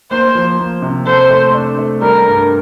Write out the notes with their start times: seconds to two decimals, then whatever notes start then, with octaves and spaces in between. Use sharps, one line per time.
0.11 A#3 C5
0.35 F3
0.59 A#3
0.82 C3
1.06 A4 C5
1.30 A3
1.54 D4
1.78 A3
2.02 G3 A#4
2.26 G2